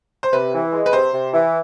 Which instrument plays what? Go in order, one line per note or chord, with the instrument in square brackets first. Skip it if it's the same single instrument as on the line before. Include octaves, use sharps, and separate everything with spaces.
[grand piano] C5
[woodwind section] C3 [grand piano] B4
[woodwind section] E3
G#3
[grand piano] B4
[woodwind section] C3 [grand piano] C5
[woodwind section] C3
E3